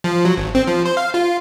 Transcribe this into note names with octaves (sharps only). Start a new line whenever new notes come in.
F3
F#3
G#1
C4
F3
C5
F5
F4